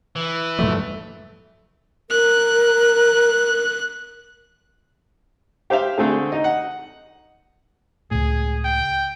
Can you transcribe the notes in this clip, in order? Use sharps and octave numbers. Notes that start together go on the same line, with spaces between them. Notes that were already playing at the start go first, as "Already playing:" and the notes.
E3
G2 F3 F#3 A3
A#4 F#6
G4 C5 E5 F5
D3 A3 C4 G#4
D#4 D#5
F#5
C#2 A2 G#4
G5